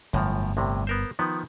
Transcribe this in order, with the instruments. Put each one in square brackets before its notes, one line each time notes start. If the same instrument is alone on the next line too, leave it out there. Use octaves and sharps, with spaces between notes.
[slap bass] G1 [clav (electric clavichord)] F#2 A2 F3
[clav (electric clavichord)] C2 A2 C3
B3 A#4 C5
D#3 F3 B3